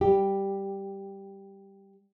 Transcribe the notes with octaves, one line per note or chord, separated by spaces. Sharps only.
G3 G4